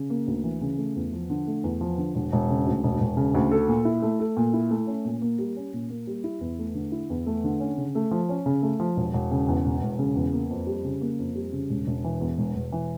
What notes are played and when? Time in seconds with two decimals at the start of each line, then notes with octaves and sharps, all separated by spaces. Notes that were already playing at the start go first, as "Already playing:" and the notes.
Already playing: C#3
0.10 A#3
0.27 D2
0.44 E3
0.61 C#3
0.78 A3
0.96 E2
1.12 F3
1.30 D3
1.47 A3
1.64 E2
1.81 F3
1.98 D3
2.15 E1
2.32 E1
2.49 C#3
2.67 D2
2.83 E1
3.00 E1
3.17 C#3
3.34 D2
3.51 A4
3.68 A#2
3.85 E4
4.02 A3
4.19 A4
4.37 A#2
4.54 E4
4.71 A3
4.87 C#4
5.05 A#2
5.22 A#3
5.39 G3
5.56 C#4
5.73 A#2
5.90 A#3
6.07 G3
6.24 E4
6.41 E2
6.59 A3
6.75 D3
6.92 E4
7.10 E2
7.26 A3
7.44 D3
7.60 C#4
7.78 C#3
7.95 A3
8.11 F3
8.29 C#4
8.46 C#3
8.62 A3
8.80 F3
8.96 E1
9.13 E1
9.31 C#3
9.48 E2
9.65 E1
9.82 E1
9.99 C#3
10.16 E2
10.33 A#3
10.50 F2
10.67 G3
10.85 C#3
11.01 A#3
11.19 F2
11.35 G3
11.53 C#3
11.69 E1
11.87 E1
12.04 E3
12.20 E2
12.37 E1
12.55 E1
12.72 E3